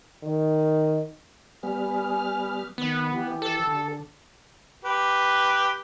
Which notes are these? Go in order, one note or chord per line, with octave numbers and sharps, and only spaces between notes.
D#3
G3 B3 G#5 F6
D#3 B3
E3 G4
A4
D3
G4 B4